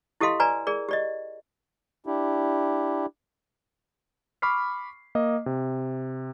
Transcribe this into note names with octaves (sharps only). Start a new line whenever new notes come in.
E4 G4 A4 D#5 F5 C6
B4 D5 G#5 A#5
G#4 A#4 D5
G4 D5 D#5
D4 E4 G4
B5 C#6 D6 F6 B6 C7
A#3 D#5
C3